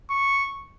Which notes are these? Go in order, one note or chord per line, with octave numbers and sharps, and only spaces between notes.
C#6